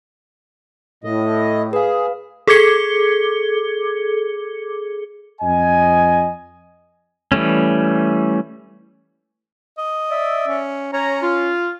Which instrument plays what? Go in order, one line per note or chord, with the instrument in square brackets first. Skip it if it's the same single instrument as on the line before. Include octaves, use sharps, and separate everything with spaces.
[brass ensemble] A2 [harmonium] D#5
[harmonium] G#4 [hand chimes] B4 F5
[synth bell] G#4 A4 D6 G#6 C#7 G7
[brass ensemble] F2 D#5 G#5
[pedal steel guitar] E3 G3 A3 C#4
[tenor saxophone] D#5
[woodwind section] D5 E5
[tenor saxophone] C#4
[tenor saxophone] C#4 [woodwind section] C#5 A#5
[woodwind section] F4